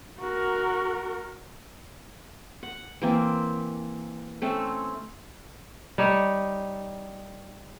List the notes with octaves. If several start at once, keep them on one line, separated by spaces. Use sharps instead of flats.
F#4 A#4
F#5
E3 A#3 C4
A3 C4 C#4
G3 D#4 C#5